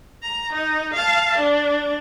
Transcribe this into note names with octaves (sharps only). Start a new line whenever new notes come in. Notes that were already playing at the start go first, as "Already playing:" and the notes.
A#5
D#4
F5 A5
D4